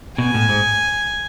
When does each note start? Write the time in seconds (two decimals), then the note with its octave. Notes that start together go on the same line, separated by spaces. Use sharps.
0.18 B2 G#5
0.34 A2
0.49 G#2